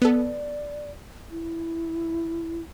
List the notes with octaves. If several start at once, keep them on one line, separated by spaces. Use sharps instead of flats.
B3 A4 D5
E4